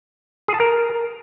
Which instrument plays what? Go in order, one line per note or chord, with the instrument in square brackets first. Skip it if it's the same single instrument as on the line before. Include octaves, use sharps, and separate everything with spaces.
[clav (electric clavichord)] G#4
A5
A#4